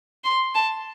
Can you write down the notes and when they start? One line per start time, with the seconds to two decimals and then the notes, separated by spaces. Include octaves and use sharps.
0.24 C6
0.55 A5